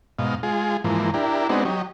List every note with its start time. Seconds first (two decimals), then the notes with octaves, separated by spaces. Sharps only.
0.19 G#2 B2 D#5 F5
0.43 G#3 F4 G#4
0.84 G#2 E3 F3 A#3
1.14 D4 E4 G4 A#4
1.49 G#3 B3 C4 D4 D#4 F#4
1.65 F#3 G4 C#5 D#5